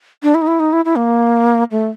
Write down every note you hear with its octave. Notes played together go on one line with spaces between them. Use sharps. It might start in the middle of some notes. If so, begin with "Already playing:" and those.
D4
E4
D#4
E4
D#4
E4
E4
A#3
A3